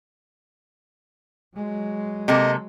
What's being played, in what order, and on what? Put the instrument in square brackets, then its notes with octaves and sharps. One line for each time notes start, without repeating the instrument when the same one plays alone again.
[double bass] F#3 G#3
[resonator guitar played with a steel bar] C3 A#3 A4 [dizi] D#5